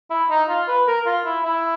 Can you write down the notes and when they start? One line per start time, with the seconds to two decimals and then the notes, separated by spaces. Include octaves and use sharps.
0.10 E4
0.30 D#4
0.49 F4
0.68 B4
0.87 A#4
1.06 F4
1.25 E4
1.45 E4